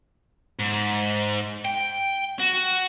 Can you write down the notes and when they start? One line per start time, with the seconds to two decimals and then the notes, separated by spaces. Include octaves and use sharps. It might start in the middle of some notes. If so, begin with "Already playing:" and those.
0.59 G#2
1.65 G5
2.40 F#4